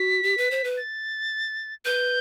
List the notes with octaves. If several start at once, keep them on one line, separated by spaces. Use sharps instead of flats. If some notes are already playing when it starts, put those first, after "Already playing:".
Already playing: F#4 B6
G4
B4
C5
B4
A6
B4 G6